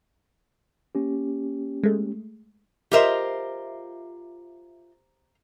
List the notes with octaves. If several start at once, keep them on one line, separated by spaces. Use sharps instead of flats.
A#3 C#4 G4
G#3 A3
F4 G4 A#4 C5 D#5 E5